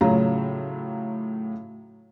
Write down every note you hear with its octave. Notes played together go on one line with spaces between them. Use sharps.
A2 C#3 F#3 F4 A#5